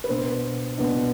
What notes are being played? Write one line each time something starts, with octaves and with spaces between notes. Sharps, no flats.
B4
B2 B3 D4 C5
B2 B3 D4